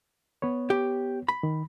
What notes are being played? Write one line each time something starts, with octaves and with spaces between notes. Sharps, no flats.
B3 B4 C#5
G4
B5
D#3